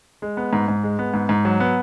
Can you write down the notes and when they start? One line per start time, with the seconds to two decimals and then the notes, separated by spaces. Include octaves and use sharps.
0.22 G#3
0.37 B3
0.53 G#2
0.68 G#2
0.84 G#3
0.99 B3
1.14 G#2
1.29 G#2
1.45 F#3
1.60 B3